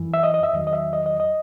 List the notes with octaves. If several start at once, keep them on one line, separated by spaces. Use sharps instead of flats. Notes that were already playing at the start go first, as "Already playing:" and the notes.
Already playing: F#2 E3
E5
D#5
D#5
E5
E2 D#3 F#3 D#5
D#5
E5
D#5
D#5
D#5